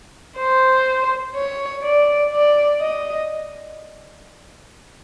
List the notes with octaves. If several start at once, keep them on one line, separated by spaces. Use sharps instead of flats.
C5
C#5
D5
D5
D#5